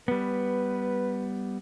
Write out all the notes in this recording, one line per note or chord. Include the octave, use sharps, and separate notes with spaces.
G3 B3 B4